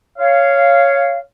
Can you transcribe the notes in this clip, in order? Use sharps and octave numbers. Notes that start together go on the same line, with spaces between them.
C#5 F5